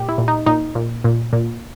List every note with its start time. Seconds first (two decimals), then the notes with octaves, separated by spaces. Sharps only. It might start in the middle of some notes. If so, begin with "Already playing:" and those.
Already playing: A#2 G4
0.09 E4
0.18 A#2
0.28 D#4
0.46 A#2 D#4
0.75 A#2
1.04 A#2
1.33 A#2